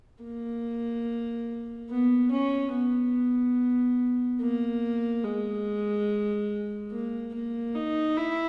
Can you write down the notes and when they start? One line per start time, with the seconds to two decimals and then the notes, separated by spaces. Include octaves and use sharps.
0.23 A#3
1.90 B3
2.32 C#4
2.74 B3
4.41 A#3
5.24 G#3
6.92 A#3
7.35 A#3
7.75 D#4
8.18 E4